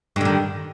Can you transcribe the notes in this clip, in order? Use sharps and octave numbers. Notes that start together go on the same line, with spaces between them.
G2 D3 D#3